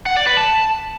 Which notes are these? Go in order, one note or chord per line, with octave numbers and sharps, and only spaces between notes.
F#5
D5
B4
A5